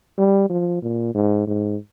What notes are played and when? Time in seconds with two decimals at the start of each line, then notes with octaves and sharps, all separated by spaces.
0.18 G3
0.49 F3
0.82 A#2
1.14 G#2
1.47 G#2